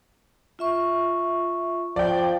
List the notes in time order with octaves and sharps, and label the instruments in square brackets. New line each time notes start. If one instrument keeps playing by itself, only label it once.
[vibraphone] F4 E5 C#6
[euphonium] F3 [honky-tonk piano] D5 G5